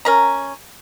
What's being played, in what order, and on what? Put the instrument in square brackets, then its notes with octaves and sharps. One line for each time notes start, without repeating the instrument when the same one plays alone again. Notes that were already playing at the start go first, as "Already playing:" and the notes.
[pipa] C#4 A#4 A#5